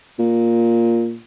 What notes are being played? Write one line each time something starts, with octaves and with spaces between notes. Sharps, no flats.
A#2